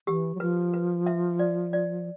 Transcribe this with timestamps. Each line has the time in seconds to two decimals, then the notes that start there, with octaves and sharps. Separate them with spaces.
0.07 E3 G4
0.35 F#3
0.40 F3 B4
0.74 B4
1.06 E5
1.39 D5
1.73 D5